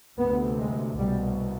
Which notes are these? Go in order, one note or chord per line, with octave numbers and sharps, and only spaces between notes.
D2 C3 B3
G#3
C2 B2 G3